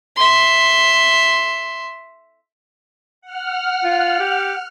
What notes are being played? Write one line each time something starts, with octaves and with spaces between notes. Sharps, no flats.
E5 C6
F#5 F6
F4
G4